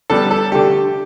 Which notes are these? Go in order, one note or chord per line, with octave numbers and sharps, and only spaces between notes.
D3 G3 B3 A4
A4
D3 A3 G4